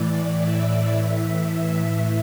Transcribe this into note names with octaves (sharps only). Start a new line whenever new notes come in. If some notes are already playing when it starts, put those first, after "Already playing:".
Already playing: A2 E3 D5
E5
A2 E3